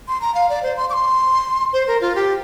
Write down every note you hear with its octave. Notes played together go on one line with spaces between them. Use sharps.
C6
A#5
F5
D5
C5
C6
D6
C6
C5
A#4
F4
G4